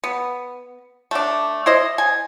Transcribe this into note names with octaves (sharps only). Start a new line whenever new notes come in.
B3
A3 D4
E4 C5 D#5
G#5